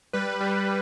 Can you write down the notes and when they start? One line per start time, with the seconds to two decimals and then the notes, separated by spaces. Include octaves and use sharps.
0.13 G3 B4
0.41 G3